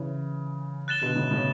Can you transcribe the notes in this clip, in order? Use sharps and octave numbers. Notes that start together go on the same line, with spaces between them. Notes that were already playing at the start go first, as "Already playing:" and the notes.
Already playing: C#3 E3
F#6 A6 E7 G7
B2 D3
A2 C#3
A2 C#3